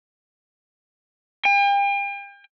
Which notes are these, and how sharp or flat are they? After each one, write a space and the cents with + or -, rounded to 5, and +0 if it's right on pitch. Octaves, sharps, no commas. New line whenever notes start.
G5 +40